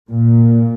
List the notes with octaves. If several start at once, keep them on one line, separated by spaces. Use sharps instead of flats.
A#2